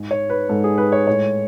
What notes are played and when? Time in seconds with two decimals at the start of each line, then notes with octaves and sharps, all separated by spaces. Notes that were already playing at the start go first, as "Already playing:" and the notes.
Already playing: G#2 G#3
0.11 C#5
0.30 B4
0.49 G#2 G#3 A4
0.64 G#4
0.78 B4
0.92 C#5
1.07 A2 G#3 C#5